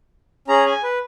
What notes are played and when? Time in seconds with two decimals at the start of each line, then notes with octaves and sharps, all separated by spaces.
0.48 C#4 G#4 A#5
0.66 G#5
0.83 B4